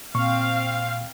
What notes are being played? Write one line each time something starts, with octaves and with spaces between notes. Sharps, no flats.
A#2 C4 F5 C#6